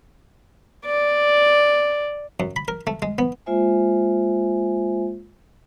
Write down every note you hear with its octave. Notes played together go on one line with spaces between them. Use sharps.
D5
F#2
B5
A#4
A3
G#3
B3
G#3 A#3 F4 C5 E5 G#5